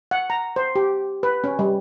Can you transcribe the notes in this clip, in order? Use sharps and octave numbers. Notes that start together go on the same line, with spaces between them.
F#5
A#5
C5
G4
B4
C#4
G3